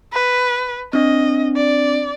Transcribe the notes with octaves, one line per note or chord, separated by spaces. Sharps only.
B4
C4 D4 D#5
D5